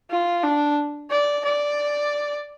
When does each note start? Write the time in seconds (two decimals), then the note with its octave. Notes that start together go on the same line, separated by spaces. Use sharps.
0.10 F4
0.43 D4
1.10 D5
1.45 D5